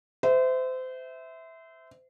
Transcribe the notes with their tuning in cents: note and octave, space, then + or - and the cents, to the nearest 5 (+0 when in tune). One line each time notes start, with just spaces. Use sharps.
C5 -30 E5 -10